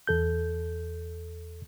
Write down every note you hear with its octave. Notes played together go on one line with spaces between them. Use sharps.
E2 A4 G6